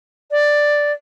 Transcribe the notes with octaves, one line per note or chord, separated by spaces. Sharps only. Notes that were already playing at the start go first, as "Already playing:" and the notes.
D5